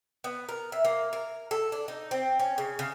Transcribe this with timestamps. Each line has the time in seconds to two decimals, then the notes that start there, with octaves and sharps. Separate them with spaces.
0.24 B3
0.49 A#4
0.72 E5
0.85 A#3
1.13 A#4
1.51 A4
1.72 D4
1.88 D#4
2.11 C4
2.39 C#4
2.58 C#3
2.79 C#3